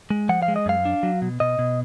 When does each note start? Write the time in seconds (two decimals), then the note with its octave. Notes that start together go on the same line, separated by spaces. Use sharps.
0.10 G#3
0.29 F3 F#5
0.43 F5
0.48 G#3
0.56 D#5
0.66 F#2 F5
0.85 D4
1.03 F#3
1.22 B2
1.40 B2 D#5
1.59 B2